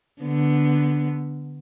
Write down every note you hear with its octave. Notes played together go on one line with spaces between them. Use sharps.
D3 B3